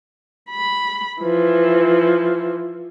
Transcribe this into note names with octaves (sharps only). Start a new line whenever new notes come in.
B5
E3 F3